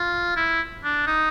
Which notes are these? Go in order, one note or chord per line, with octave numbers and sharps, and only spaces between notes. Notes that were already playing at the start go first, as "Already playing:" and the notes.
Already playing: F4
E4
D4
D#4